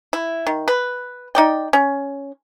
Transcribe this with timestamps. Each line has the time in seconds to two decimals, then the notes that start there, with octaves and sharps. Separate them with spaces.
0.13 E4
0.47 D#3
0.68 B4
1.35 D#4 D5 G5
1.73 C#4